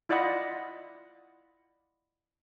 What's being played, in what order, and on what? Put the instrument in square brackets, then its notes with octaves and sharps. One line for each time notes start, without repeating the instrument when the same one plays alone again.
[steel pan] E4 F4 D5 D#5 F#5 B5